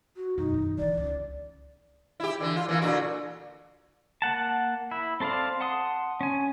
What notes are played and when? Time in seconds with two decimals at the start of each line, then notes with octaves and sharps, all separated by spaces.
0.16 F#4
0.38 F#2 B2 D#4
0.54 D#3
0.78 D3 E3 D5
0.98 C#2
2.20 E4 G4
2.40 D3 E3
2.56 F4
2.69 E3 A#3
2.82 A#2 D3 F#4
4.22 A#3 F#5 A5
4.91 E4
5.20 C4 A4 C5 D5 F5
5.61 F#5 A5 C6 D#6
6.21 C#4 G#5